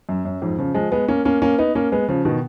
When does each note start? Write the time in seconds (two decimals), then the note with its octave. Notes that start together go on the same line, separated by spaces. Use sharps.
0.09 F#2
0.25 F#2
0.42 F2 G#2
0.58 C#3 F3
0.75 F3 G#3
0.92 G#3 B3
1.08 A#3 C#4
1.25 A#3 C#4
1.42 A#3 C#4
1.58 B3 D#4
1.75 A#3 C#4
1.92 G#3 B3
2.08 C#3 F3
2.25 B2 D#3